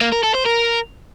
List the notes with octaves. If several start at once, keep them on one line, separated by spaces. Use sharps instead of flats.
A#3
A#4
A4
C5
A#4